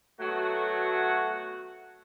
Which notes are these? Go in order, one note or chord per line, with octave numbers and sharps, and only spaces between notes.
F#3 A3 B3 F#4